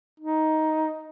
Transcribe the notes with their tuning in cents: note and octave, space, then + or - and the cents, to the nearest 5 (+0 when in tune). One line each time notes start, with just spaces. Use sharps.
D#4 +10